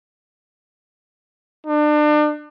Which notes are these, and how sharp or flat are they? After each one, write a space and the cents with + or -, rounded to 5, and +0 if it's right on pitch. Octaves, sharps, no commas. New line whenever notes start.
D4 +35